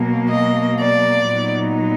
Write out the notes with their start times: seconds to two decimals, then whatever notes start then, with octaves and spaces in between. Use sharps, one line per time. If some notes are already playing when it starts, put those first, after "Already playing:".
Already playing: B2 F#3 A#3
0.31 D#5
0.81 D5
1.31 A#2 F#3 B3 D#4